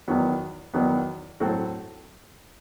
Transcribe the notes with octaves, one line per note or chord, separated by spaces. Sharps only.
E2 D#3 F#3 B3
E2 D#3 F#3 B3
A2 F#3 C4 F#4 A4